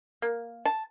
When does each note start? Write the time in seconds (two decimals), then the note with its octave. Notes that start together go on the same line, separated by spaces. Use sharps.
0.22 A#3
0.65 A5